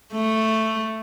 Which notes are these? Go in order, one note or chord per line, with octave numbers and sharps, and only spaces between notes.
A3